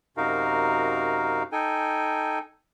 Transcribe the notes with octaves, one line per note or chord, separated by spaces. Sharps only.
F#2 C3 D#4 F#4 A#4 F5
D#4 A4 G5 G#5